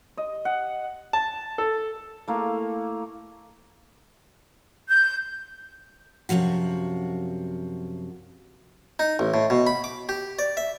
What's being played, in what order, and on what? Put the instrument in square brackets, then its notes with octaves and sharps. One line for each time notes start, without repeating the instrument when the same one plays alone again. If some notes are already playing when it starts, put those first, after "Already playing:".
[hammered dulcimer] D#5
F#5
[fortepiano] A5
A4
[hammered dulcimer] A3 A#3 E4 F5
[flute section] G6
[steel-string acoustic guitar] F#2 C3 F3 F#4
[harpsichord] D#4
A1
A2
B2
B5
D6
G4
D5
E5